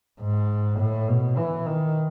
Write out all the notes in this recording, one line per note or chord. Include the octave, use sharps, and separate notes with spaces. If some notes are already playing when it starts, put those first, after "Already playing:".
G#2
A2
B2
E3
D#3